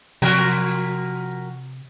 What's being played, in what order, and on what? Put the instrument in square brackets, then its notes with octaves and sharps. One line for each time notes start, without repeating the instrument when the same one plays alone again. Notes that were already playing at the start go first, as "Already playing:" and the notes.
[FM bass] C3 [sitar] F3 F#4 A#4